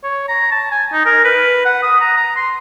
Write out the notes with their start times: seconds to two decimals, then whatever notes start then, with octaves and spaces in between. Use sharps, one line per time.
0.04 C#5
0.29 A#5
0.52 A5
0.72 G#5
0.93 D#4
1.06 A#4
1.25 B4
1.66 F#5
1.83 D#6
2.01 A#5
2.17 A#5
2.37 C6